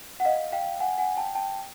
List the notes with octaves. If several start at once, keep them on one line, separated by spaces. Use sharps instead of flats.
F#5
D#5 F5
F5 G5
F#5 G#5
F#5 G#5
G5 A5
G5 A5